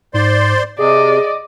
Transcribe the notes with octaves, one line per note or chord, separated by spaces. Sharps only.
G#2 C5 D5 C6
C3 G#4 D5 D#5